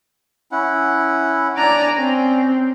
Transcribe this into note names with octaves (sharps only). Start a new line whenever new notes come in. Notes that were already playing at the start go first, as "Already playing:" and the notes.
C#4 E4 F#5
D4 D5 G#5 A#5
C4 C#4